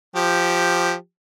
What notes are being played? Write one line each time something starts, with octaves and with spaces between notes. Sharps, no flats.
F3 G4